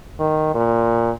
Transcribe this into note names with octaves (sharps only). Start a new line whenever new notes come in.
D#3
A#2